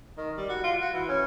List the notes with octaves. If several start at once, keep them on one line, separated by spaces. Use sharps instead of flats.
D#3
G3
F#4
F4
F#4
E3
C#4